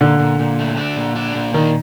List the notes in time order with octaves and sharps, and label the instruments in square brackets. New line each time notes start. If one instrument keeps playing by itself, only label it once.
[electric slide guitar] A#2 [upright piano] D3
[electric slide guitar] A#2
A#2
A3
D4
A#2
D4
A#2
[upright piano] D#3 [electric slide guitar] D4